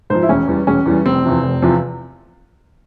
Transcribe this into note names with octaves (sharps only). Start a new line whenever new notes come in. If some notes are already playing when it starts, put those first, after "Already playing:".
G#2 F3 C5
E4
E1 C#4
E2 E3 G3
E1 C#4
E2 E3 G3
F1 C4
E2 C3 F3
F1
E2 C3 F3